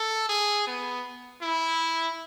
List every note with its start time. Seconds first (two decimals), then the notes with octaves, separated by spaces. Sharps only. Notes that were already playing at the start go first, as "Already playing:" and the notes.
Already playing: A4
0.29 G#4
0.67 B3
1.42 E4